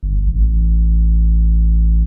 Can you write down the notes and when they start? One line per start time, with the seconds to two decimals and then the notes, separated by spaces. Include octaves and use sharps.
0.03 G1
0.27 A1